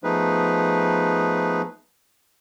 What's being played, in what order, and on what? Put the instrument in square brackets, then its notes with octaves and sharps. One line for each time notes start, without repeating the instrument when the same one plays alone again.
[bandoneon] F3 A3 B3 D#4 G#4 B4